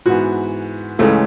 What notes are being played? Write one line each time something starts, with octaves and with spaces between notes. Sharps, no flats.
G#2 E3 B3 F#4
C#2 C#3 E3 G#3 A3 C#4